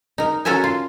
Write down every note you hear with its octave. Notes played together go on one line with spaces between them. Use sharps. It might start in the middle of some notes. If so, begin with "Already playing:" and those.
D#4 A#4
C#4 F#4 A4 A#4 E5 G#5
F4